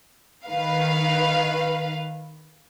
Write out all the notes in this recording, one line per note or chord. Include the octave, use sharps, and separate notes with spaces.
D#3 B4 F5